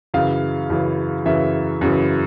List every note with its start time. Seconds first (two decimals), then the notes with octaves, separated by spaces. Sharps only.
0.14 F#2 C#3 E3 F5
0.70 F#2 C#3 E3
1.25 F#2 C#3 E3 E5
1.81 F#2 C#3 E3